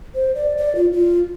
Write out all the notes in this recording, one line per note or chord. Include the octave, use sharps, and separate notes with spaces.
C5
D5
D5
F4
F4